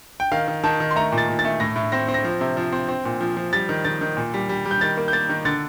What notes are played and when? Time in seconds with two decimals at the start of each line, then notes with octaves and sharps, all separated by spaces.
0.20 G5
0.32 D#3 F5
0.48 D#3
0.64 D#3 A5
0.80 D#3
0.91 C6
0.96 A3 A#5
1.12 A#2
1.18 A6
1.28 A#2
1.39 A6
1.45 A3
1.60 A2 A#6
1.76 A2
1.92 C4 A#6
2.08 C4
2.14 A#6
2.24 F3
2.41 C3
2.57 F3
2.72 C4
2.88 C4
3.05 A#2
3.20 F3
3.37 F3
3.53 G3 A6
3.69 D#3
3.85 D#3 A6
4.01 D#3
4.17 A#2
4.34 G3
4.49 G3
4.65 G3
4.71 G6
4.81 D#3 A6
4.97 A#3
5.08 G6
5.13 A#3 A6
5.29 D#3
5.45 D3 A6